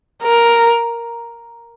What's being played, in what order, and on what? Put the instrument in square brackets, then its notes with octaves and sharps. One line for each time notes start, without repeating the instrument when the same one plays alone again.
[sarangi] A#4